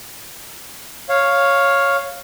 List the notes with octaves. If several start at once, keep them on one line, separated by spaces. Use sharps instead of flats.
C#5 F5